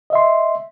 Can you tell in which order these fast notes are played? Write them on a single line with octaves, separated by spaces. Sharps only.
D#5 E5 C6